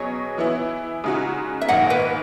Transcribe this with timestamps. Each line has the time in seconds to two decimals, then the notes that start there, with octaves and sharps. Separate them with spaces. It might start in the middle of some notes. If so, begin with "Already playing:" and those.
Already playing: B2 F#3 C#4 G#4 C#5 D#5
0.38 E3 B3 E4
1.04 C#3 G#3 D#4 F#4
1.61 E5
1.68 A#1 G#2 D#3 A#3 D#5 F#5
1.90 B4